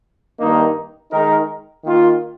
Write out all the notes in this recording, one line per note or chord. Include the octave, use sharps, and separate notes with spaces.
G2 D#3 A#3 D#4
D#3 G#3 D#4 A#4
D#3 A#3 F4